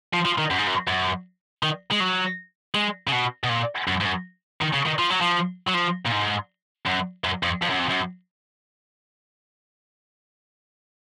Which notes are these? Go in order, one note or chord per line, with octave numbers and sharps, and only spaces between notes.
F3
F3
D#3
F#2
G#2
F#2
F#2
D#3
G#3
F#3
G#3
C#3
B2
B2
A#2
F#2
G#2
F#2
D#3
C#3
D#3
F3
F#3
F3
F#3
F3
A#2
G#2
F#2
F#2
F2
F2
F#2
F2
F#2